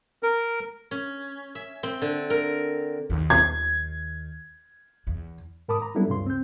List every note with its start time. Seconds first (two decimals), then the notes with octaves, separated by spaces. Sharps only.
0.23 A#4
0.91 C#4
1.55 E5
1.83 C4
2.02 D3
2.30 A#4
3.10 D#2
3.30 G#6
5.07 E2
5.68 G#2 A#4 A5 B5 D6 D#6
5.82 A#5
5.95 F#3 G3 B3 D4 E4 A4
6.08 D2 G2 C#3 C6
6.26 C4 G6